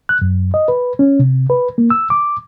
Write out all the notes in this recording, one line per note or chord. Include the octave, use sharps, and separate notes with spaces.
F#6
F#2
D#5
B4
C#4
C3
B4
A#3
E6
D6